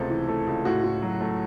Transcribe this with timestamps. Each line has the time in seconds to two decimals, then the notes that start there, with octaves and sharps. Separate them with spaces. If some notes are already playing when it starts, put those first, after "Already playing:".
Already playing: C#2 C3 A3 A4
0.10 E3
0.28 A3
0.47 C#2
0.65 A2 F#4
0.84 A2
1.02 F#3
1.21 A3